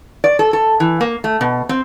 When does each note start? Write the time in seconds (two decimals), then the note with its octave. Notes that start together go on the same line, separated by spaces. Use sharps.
0.24 D5
0.39 A4
0.53 A4
0.80 E3
1.01 A#3
1.24 A3
1.41 B2
1.69 C4